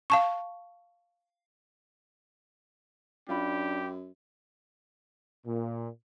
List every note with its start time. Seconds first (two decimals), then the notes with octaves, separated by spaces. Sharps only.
0.10 F5 A5 C#6
3.29 F#2 D4 F4 G4 B5
5.45 A#2